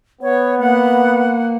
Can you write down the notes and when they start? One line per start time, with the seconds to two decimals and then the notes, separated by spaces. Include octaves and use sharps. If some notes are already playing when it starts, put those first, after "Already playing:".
0.22 B3 C#5
0.59 A#3 F#5